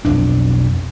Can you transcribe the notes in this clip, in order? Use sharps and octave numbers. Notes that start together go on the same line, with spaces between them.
B1 F2 D4